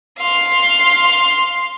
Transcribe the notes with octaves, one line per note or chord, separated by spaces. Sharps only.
F5 C6